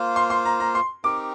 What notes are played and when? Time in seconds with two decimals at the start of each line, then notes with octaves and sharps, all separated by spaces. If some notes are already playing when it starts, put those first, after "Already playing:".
Already playing: A#3 F4 C5 F5
0.16 C6
0.30 C6
0.45 A#5
0.60 A#5
0.75 C6
1.04 C4 D#4 G4 A#4 D6